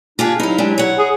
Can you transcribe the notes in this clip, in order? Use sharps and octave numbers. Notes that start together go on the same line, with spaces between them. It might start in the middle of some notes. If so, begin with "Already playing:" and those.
G3 A#3 D4 F4 G4 G#4
G2 F#3 D#4 E4 F5
G#3 D4 G4
C#5 F#5
G#4